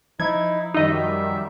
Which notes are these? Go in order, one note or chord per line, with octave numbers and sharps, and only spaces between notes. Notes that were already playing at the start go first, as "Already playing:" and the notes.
F3 D#4 E4 G#6
F#2 D#3 G3 D#4 D#5 E5